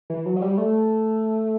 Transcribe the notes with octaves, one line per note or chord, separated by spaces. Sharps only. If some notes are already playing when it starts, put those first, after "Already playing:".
E3
F#3
F#3
G3
A3